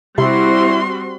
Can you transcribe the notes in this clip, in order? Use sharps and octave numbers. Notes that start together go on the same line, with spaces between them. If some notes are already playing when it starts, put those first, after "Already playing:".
C3 G3 C4 E4 F#4 C6